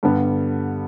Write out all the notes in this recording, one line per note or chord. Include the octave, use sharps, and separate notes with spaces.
G2 D3 G3 B3